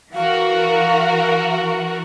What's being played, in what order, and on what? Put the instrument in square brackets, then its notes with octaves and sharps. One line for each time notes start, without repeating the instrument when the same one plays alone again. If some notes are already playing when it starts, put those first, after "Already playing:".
[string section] E3 F#4 A#4 [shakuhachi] F5